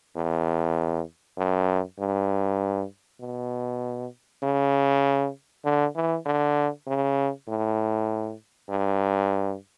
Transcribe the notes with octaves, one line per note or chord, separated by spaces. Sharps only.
E2
F#2
G2
B2
C#3
D3
E3
D3
C#3
A2
G2